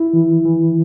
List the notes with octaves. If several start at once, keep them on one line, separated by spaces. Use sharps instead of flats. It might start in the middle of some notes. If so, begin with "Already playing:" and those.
Already playing: E4
E3
E3